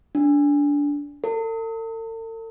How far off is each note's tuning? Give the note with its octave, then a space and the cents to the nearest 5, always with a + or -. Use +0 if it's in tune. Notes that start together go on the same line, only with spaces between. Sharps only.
D4 -20
A4 +45